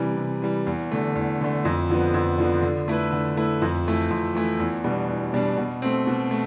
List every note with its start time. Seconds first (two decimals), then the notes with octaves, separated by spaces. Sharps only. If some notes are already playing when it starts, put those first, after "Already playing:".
Already playing: C3 E3 G3
0.17 C3
0.42 E3 G3
0.67 E2
0.92 D3 A3
1.15 E2
1.41 D3 A3
1.65 F2
1.89 D3 F3 B3
2.14 F2
2.38 D3 F3 B3
2.63 D3
2.88 A3 E4 B4
3.12 D3
3.37 A3 E4 B4
3.62 F2
3.86 E3 A3 E4
4.11 F2
4.34 E3 A3 E4
4.60 E2
4.84 B2 G3 D4
5.08 E2
5.34 B2 G3 D4
5.57 B2
5.82 A3 C4
6.07 B2
6.31 A3